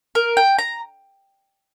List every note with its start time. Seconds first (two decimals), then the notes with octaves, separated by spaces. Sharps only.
0.15 A#4
0.37 G5
0.58 A#5